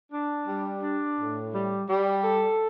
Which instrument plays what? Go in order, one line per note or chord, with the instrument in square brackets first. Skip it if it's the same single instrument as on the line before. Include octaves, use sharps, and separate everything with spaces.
[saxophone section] D4
G3
D4
A2
G3
G3
A4